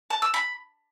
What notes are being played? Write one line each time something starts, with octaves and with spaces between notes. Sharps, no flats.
A5
E6
B5